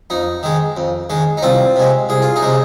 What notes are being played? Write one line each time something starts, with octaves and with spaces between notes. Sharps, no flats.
F2 D#4
D#3 G#3
F2
D#3 G#3
D#4
C2 C4 F4
C3 G#3
C2 G#4
F4
D#4 G#4
C3 G#3